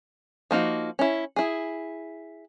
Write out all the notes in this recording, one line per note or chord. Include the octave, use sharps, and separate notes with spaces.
F3 A#3 D#4 F#4
C#4 E4
E4 G#4